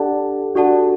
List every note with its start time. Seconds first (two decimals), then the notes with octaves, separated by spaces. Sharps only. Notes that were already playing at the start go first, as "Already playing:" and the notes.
Already playing: D4 G4 A4 D5 F#5 A5
0.55 D4 F#4 A4 D5 F#5 A5